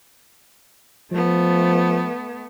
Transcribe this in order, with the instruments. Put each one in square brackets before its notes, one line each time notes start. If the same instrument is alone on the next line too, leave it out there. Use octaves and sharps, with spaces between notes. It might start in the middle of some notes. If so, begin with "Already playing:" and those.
[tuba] F3 [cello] A3 B3